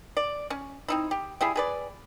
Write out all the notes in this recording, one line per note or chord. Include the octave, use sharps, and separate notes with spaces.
D5
C#4
C4 D#4 E4
G4
G3 E4 G#4
G#4 B4 D5